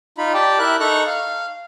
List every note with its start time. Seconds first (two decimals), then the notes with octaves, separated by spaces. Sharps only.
0.18 D#4 F4 B5
0.34 G4 D5 G5 A5
0.59 E4 A#4 E5 F#6
0.80 D#4 A4 A#5 C#6 F#6
1.07 F5